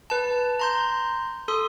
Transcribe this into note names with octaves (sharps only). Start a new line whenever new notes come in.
B4 A5
A#5 C6 G6
A4 C6 D#6